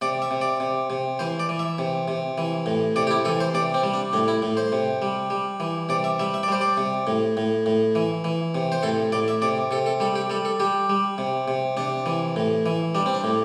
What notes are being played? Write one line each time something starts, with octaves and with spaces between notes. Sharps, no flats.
C3 D5
E5
C3
D5
C3
C3
E3 C5
D5
E3
E5
C3
C3
E3
A2
C3 D5
G4
E4
E3 A4
C5
C3 D5
C4
G3
D4
A2 D4
E4
A2
C5
C3
G3
G3
E3
C3 D5
E5
G3 E5
E5
D5
G3 C5
D5
C3
A2
A2
A2
E3
E3
C3
C5
A2 A4
A2 D5
E5
C3 D5
C3 A4
A4
G3 A4
G4
G3 A4
A4
G3 G4
G3
C3
C3
C3 D4
E3
A2
E3
G3 D4
C4
D4
A2